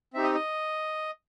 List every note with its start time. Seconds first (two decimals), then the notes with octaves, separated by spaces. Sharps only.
0.13 C4 D#4 G4 E5
0.24 D#5
0.35 D#5